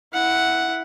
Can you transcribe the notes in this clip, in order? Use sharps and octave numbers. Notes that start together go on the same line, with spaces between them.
E4 F#5